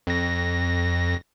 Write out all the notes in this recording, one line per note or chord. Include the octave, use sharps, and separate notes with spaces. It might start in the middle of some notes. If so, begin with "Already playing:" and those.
F2 A#6